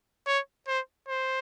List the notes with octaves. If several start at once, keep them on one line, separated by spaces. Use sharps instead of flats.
C#5
C5
C5